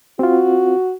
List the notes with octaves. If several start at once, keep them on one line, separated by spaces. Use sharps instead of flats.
C4 F4 F#4